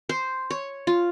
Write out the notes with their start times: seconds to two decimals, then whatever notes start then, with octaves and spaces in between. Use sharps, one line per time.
0.09 C5
0.50 C#5
0.87 F4